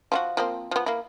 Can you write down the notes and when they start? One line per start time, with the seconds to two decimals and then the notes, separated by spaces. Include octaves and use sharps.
0.12 F3 C4 F#4
0.37 F3 A#3 C4
0.71 F3 B3
0.86 A#3 E4